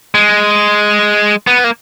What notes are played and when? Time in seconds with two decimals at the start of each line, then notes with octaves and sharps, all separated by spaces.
0.15 G#3
1.47 B3
1.64 A#3